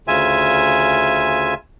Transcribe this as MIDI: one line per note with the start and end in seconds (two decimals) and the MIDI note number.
0.08 1.54 38
0.08 1.54 49
0.08 1.54 65
0.08 1.54 76
0.08 1.54 80